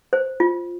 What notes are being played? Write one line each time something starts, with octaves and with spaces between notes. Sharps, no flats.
C5
F4